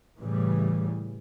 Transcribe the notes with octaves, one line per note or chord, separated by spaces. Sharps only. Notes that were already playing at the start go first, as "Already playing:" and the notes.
A2 C#3 E3 G3